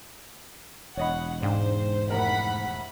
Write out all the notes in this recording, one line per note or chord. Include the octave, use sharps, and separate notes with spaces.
E1 C#5 D#5 F#5 B5
G#2 D4 C5 F5 G5
F1 A2 A#4 F#5 B5 B6